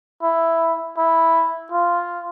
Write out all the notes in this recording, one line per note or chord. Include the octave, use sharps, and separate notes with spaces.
E4
E4
F4